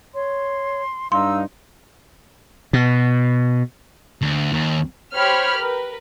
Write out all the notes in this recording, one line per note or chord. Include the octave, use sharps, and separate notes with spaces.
C#5 C6
G2 D4 D#4 F5 C6 E6
B2
D2
D#2
G4 C5 C#5 B5 F6
A#4 B4